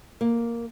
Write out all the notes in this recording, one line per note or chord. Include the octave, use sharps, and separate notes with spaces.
A#3